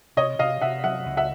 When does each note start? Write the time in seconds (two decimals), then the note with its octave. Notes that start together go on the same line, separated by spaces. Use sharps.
0.17 C3 C#5 D#5
0.39 C3 D#5 F5
0.61 C3 E5 F#5
0.84 F#3 E5 F#5
1.06 C#2
1.17 E5 F#5